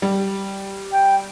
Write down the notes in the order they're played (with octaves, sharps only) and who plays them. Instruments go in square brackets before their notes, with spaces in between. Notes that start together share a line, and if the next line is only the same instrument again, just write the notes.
[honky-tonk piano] G3
[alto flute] G5